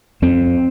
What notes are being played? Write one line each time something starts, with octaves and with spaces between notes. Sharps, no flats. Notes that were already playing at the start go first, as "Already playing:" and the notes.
F2 C4